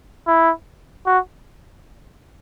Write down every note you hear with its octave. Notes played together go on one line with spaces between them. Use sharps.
E4
F#4